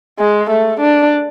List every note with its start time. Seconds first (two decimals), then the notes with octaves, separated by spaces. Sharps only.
0.19 G#3
0.50 A3
0.80 D4